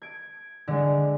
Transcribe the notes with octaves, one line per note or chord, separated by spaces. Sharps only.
G#6 D7
D3 G#3